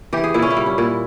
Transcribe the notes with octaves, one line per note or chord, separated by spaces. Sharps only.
E3 G4
G#4
A#2 E4
C#4
E4
G3
C#4
A#2 E4